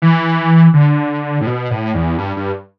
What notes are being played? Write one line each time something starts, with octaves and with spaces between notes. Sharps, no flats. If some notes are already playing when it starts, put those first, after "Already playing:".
E3
D3
A2
B2
A2
E2
G2
G2